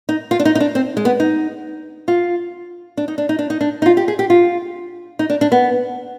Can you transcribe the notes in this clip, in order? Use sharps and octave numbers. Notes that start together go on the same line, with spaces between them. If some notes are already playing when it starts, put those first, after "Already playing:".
D#4
F4
D4
D#4
D#4
D4
C4
G#3
B3
D#4
F4
D4
D#4
D4
D#4
D4
D#4
D4
D#4
F4
G4
G#4
G4
F4
D#4
D4
D4
B3